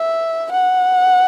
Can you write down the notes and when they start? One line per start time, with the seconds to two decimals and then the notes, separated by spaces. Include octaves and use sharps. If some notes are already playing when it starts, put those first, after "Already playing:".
Already playing: E5
0.52 F#5